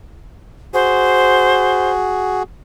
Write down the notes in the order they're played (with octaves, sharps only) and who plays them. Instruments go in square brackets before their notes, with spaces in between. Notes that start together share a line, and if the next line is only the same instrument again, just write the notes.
[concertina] F#4 G#4 [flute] C5